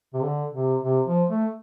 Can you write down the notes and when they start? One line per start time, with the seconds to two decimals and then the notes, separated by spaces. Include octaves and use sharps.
0.14 C3
0.23 D3
0.53 C3
0.83 C3
1.07 F3
1.29 A3